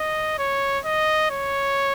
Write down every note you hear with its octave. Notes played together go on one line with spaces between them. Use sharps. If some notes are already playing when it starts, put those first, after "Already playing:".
Already playing: D#5
C#5
D#5
C#5